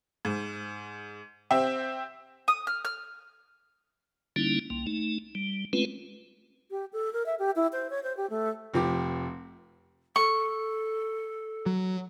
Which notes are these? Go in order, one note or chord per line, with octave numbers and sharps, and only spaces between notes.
G#2
C4 G4 C5 E5
D#6
F6
F6
D3 G3 A#3 C#4 D#4 E4
C2 A#3
A3 D#4
G3
G#3 A3 C4 C#4 F4 B4
G4
A4
A#4
E5
G4
E4
C5
C#5
C5
G4
A3
F1 F3 G4 D6
A4 C#6
F#3